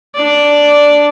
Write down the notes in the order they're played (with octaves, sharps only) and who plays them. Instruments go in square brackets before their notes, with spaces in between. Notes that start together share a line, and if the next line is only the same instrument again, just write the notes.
[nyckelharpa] D4 D5